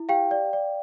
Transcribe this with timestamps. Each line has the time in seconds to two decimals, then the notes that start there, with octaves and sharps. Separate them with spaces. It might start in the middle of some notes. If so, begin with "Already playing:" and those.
Already playing: E4
0.09 G4 F5 G5
0.31 D5
0.53 D5